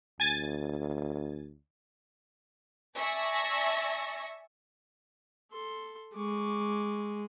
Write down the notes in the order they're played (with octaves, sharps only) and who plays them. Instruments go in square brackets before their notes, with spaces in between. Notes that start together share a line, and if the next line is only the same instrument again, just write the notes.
[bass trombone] D2 [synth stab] G#5 A6
[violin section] D5 E5 G#5 A5 C#6 A#6
[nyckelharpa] A4 C6
[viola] G#3 [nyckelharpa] C#6 D6